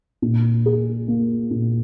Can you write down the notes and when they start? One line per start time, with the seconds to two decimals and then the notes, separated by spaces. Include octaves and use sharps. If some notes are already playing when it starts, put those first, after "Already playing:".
0.22 A#2
0.66 G#4
1.08 A#3
1.51 A#2